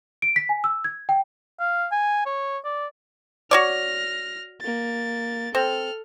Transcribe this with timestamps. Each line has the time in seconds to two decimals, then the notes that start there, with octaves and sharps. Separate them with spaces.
0.22 D7
0.36 B6
0.49 G#5
0.64 E6
0.84 G#6
1.09 G5
1.60 F5
1.92 G#5
2.26 C#5
2.64 D5
3.51 F#4 C#5 D5 F6 A#6
4.61 A#3 A6
5.55 C4 A4 F6